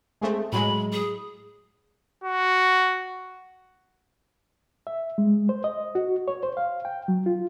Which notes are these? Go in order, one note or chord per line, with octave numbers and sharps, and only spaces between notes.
G#3 A3 C4
A2 F#3 G#3 B5
G#4
F#4
E5
G#3
C5
D#5
F#4
C#5
C5
F5
G5
F#3
F4